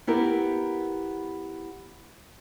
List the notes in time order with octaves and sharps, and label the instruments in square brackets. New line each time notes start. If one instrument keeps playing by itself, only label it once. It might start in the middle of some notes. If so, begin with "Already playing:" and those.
[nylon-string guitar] B3 E4 G4 A#4